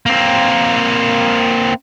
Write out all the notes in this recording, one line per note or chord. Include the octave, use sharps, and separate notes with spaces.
A#3 C4